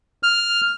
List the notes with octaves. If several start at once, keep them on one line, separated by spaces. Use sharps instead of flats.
F6